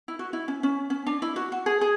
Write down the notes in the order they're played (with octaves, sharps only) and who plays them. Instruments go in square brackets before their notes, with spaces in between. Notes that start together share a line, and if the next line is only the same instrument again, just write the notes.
[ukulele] E4
F#4
E4
C#4
C#4
C#4
D4
E4
F#4
F#4
G#4
G#4